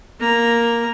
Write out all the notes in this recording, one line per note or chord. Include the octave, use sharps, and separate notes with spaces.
A#3 A#5